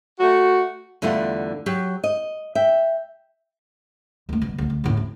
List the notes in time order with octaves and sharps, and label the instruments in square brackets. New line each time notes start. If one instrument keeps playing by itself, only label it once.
[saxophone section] A3 F#4
[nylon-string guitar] E2 D3 G3 A3 F4 F#5
F#3 G4
D#5
E5 G5
[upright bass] D#2 A3
B2 G3
D2 F3
D2
D#2 A2
C4